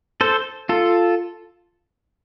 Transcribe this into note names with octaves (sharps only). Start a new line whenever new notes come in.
A4 C5
F4 A4